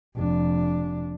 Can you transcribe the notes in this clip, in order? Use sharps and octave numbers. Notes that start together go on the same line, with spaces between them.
F1 D4